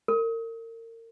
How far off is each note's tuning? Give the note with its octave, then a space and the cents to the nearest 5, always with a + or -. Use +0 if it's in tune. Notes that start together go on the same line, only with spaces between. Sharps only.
A#4 -35